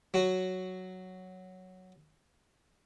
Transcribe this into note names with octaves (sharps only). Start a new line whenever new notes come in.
F#3 F#4